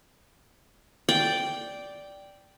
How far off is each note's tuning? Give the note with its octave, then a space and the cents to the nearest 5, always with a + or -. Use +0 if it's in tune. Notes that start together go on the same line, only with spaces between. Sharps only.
D5 -5 G5 -5